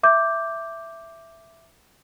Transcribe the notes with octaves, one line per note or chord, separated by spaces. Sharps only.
E5 D6 G6